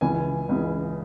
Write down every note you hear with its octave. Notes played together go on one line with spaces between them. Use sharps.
C#2 C#3 E3 G#5
C#2 C#3 E3